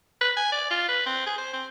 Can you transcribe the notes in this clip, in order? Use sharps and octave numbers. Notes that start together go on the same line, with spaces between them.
B4
G#5
D5
F4
B4
C4
G#4
C5
C4